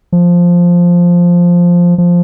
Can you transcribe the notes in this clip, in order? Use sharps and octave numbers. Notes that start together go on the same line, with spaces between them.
F3
F3